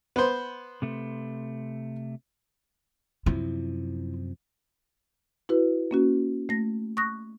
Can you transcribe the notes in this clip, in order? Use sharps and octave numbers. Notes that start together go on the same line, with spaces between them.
B3 C5
C3 A3
F#2 C3 F3 E4
E4 F#4 B4
A#3 C#4 F#4
A3 A#6
C#6 D#6 F#6 A#6